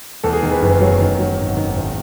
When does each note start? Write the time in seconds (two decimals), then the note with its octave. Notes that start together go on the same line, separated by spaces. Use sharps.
0.24 E2 A4
0.33 G#4
0.43 D#3
0.52 B4
0.62 F#1
0.81 F#3
1.00 D#3
1.19 F#3
1.38 G#1
1.57 D#3
1.76 E1